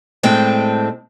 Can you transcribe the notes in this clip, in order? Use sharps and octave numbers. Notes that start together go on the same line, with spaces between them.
A2 G#3 C4 D4 G5